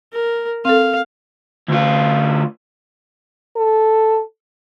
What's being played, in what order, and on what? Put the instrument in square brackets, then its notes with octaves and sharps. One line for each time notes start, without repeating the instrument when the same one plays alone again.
[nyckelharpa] A#4
[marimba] C4 A4 [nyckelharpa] F5
[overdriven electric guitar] D2 F4
[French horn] A4